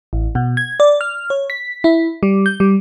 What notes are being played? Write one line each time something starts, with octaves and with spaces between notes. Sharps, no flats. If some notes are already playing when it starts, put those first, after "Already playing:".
A1
B2
G#6
D5
F6
C#5
B6
E4
G3
G6
G3